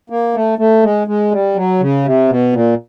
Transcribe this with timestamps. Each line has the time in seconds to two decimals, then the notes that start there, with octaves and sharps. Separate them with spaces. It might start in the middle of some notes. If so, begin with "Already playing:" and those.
0.10 A#3
0.35 A3
0.58 A3
0.83 G#3
1.07 G#3
1.31 G3
1.55 F#3
1.81 C#3
2.05 C3
2.29 B2
2.53 A#2